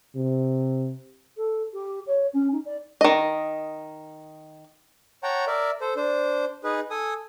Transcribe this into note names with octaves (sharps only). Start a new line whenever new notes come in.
C3
A4
G4
C#5
C#4
D#4
D5
D#3 D#5
C#5 F#5 G5 A5 A#5
A#4 D5 E5
A4 C5
D4 C5
D#4 G#4 B4
A4 G#5 D#6